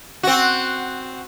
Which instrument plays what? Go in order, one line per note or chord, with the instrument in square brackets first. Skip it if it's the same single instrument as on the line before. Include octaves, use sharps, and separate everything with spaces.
[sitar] C4 F#4